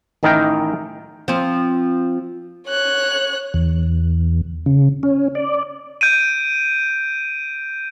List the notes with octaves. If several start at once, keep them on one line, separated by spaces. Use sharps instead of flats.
A1 D#3 D#4 E4 A#4 G5
F3 C4
C#5 F#6
E2
C#3
C#4
D5
G6 D7 D#7